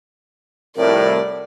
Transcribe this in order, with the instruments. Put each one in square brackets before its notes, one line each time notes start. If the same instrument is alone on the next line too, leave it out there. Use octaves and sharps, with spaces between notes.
[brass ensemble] C2 F2 A2 [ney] A#4 [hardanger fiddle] D5